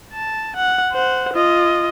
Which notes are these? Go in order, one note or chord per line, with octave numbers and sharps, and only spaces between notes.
A5
F#5
C5 F#5
F4 D#5